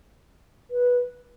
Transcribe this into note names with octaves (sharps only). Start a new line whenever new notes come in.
B4